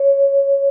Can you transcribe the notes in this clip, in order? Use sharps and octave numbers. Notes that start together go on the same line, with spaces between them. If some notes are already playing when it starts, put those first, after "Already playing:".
Already playing: C#5